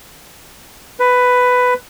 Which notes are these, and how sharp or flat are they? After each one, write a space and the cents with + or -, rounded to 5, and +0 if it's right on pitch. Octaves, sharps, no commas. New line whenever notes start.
B4 +10